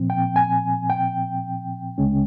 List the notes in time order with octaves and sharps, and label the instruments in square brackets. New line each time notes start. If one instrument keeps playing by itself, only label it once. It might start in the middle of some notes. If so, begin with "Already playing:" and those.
Already playing: [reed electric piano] A#2 F3 C4
G5
G#5
G5
C#2 C#3 G#3 C#4